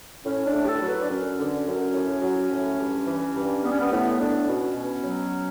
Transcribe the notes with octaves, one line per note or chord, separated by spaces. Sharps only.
A2 C#4
D4
A2
G4
A4
F#3
B4
D4
F#2 C#4
D3
F#2
A2
F#3
A2
G2
E3
G2
G3 B3
C#4
B3
A2 B3
A2 D4
B2 C#4
B2
F#3